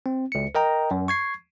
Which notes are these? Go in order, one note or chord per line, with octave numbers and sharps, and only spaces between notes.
C4
C#2 C#7
A#4 D#5 G5 A#5
F#2
C#6 G#6 C7